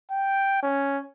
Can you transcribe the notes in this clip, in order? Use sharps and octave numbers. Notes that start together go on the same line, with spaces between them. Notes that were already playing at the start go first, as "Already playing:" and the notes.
G5
C#4